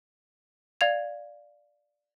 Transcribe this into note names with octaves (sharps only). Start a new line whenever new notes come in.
D5 F5 G#6 F7